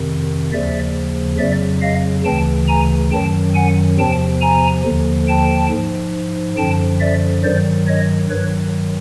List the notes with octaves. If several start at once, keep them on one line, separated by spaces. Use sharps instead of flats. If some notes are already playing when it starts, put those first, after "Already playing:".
Already playing: F2 C3 D#3
D#2 C#3 F3 D5 E5
F2 C#3 F#3 D5 E5
D#5 F5
D2 C#3 E3 G5 A5
G#5 A#5
F#2 D#3 F#3 G5 A5
F#5 G#5
E2 C3 F3 G5 A5
G#5 A#5
D#2 D3 F3
G5 A5
G#2 F3
F#2 D3 F3 G5 A5
D5 E5
G2 D#3 F#3 C5 D5
C#5 D#5
G2 D#3 F#3 B4 C#5